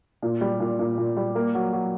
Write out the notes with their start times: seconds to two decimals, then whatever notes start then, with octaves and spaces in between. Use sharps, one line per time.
0.23 A#2
0.41 G3
0.60 A#2
0.79 A#2
0.98 A#2
1.17 G3
1.35 A#3
1.55 F#3
1.73 F#3